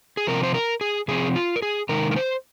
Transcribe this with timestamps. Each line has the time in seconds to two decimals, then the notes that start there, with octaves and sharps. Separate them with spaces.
0.17 G#4
0.27 C3 F3 C4 A#4
0.43 C5
0.54 A#4
0.81 G#4
1.08 C3 F3 C4 G#4
1.36 F4
1.56 A#4
1.62 G#4
1.89 C3 D#3 G#3 D#4 A#4
2.11 A#4
2.16 C5